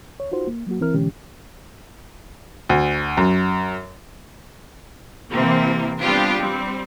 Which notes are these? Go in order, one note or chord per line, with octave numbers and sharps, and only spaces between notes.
D2 C#5
D#4 F4 F#4 C5
A#3
F#3 A#3 F#4
C2 E3 C4 E4 A#4 F6
B2 D3 E3 G#3 C#4 G4
D2
F#2
C3 E3 A#3 C4
G3 B3 C4 D4 F4 G4
G3 C4